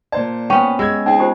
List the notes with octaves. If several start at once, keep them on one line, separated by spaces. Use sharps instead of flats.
A#2 C5 D5 A5
B3 C#4 G5 C#6
G#3 E6 G#6
C4 D#4 G#4 G5
F4 G4 C5